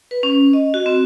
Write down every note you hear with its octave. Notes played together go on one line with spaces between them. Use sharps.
B4
C#4
D#5
F#4
C4